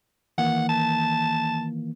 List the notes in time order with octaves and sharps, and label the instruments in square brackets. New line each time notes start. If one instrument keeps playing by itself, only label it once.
[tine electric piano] D#3 E3 A#3 [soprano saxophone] F#5
[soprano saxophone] A5